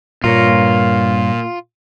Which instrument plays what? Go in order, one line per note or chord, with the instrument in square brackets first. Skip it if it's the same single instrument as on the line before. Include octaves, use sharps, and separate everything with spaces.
[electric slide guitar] G2 A#4 C#5 [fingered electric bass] A#2 [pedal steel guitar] F4